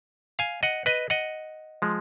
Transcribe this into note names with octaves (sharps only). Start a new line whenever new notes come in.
F5 G#5
D#5 F#5
B4 D#5
D#5 F#5
F3 G#3